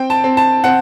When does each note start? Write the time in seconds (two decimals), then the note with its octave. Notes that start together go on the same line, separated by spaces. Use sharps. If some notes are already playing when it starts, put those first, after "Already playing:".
Already playing: C4 G5
0.10 A5
0.24 C4
0.37 A5
0.64 C4 F#5